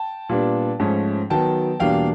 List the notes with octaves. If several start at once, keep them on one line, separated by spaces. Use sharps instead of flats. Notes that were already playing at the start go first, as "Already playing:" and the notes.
Already playing: G5 A5
A#2 G3 B3 D4
G#2 F3 A3 C#4
D#3 F#3 B3 G5 A5
E2 B2 G3 A#3 D4 F5 G5